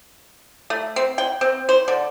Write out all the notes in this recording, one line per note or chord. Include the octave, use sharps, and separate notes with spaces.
A3
C4
G5
C4
C5
D3